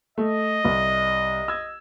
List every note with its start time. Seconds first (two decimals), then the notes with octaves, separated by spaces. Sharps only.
0.18 A3 D#5
0.65 C2
1.48 E6 G#6